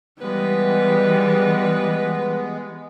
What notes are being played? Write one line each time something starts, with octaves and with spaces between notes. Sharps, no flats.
E3 G3 G#3 B3 B4